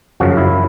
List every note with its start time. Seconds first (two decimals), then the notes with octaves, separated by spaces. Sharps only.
0.20 F#2 C#3 F3 F#4
0.37 E4